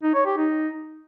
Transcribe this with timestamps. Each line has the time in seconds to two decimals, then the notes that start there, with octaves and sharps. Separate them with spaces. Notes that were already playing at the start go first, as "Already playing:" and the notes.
0.03 D#4
0.14 C#5
0.26 G4
0.37 D#4